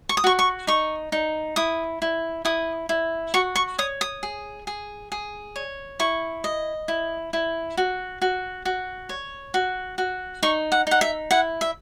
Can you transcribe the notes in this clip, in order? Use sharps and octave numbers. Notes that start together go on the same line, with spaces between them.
C#6
D#6
F#4 C#6
C#6
D#4 C#6
D#4
E4 D#6
E4
E4 D#6
E4
F#4 C#6
C#6
C#5 D#6
D#6
G#4
G#4
G#4
C#5
E4 C#6
D#5
E4
E4
F#4
F#4
F#4
C#5
F#4
F#4
D#4 C#6
F#5
D#4 F#5
E5
E4 F#5
E5